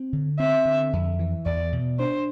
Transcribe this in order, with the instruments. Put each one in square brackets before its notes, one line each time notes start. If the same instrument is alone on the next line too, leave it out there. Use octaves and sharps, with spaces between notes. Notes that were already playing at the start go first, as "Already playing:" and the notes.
Already playing: [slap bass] C4
D3
[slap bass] C4 [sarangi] E5
[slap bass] D3
F2
E3
[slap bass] E2 [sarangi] D5
[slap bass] B2
[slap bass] D4 [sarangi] C5